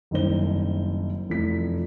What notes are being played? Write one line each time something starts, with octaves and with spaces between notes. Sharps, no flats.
F#1 C2 D#3 C5 G7
F1 E3 F3 B6